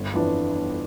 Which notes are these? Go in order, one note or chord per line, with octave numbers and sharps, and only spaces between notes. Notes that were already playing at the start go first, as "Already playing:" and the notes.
Already playing: G1
F2 E3 B3 D4